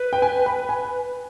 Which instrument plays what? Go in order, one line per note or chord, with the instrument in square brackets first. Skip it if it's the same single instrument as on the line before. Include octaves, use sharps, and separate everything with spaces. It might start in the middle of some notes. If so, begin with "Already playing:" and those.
Already playing: [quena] B4
[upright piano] G5
G#5
B5
G#5